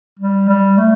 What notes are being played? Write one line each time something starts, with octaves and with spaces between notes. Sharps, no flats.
G3
G3
A3